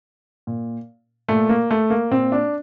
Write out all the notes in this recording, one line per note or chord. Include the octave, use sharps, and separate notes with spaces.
A#2
A#2 A3
A#3
A3
A#3
A#2 C4
D4